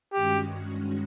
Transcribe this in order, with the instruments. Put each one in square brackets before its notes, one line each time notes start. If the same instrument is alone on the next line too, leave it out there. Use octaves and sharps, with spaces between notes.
[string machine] G2 D#3 G#3 C#4 F#4 [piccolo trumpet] G4